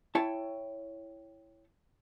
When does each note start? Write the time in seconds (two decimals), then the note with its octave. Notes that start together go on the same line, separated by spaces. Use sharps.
0.15 E4 C#5 G5 A5